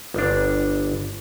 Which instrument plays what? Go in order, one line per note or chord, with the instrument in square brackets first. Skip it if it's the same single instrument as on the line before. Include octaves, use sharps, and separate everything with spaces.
[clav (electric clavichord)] G1 D4